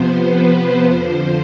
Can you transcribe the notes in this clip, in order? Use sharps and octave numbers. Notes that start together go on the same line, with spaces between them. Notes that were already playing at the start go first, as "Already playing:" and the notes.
Already playing: C3 F3 B3 C5
B4
C5
F2 D3 F3